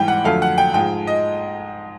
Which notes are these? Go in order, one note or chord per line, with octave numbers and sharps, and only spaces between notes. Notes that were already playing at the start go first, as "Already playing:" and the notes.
Already playing: G#2 E3 G3 G5
F#5
F2 D3 F#3 A3 F5
F#5
G5
G#2 F3 G#3 G5
D#5